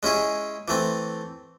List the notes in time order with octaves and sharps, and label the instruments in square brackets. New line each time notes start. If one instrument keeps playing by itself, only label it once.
[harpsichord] G#3 C#4 E4 G#4
E3 A3 C4